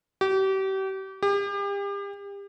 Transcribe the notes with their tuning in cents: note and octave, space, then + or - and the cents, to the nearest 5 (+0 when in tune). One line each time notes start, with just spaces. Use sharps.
G4 -35
G4 +35